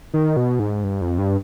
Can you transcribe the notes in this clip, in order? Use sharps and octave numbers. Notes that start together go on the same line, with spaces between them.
D#3
B2
G#2
G2
F2
G2